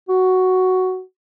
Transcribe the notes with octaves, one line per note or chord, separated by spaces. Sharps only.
F#4